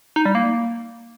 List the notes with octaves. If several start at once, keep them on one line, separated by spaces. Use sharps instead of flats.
D#4
G3
A#3